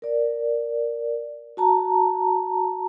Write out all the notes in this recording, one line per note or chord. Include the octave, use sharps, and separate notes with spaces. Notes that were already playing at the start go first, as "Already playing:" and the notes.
A#4 D5
F#4 A5 A#5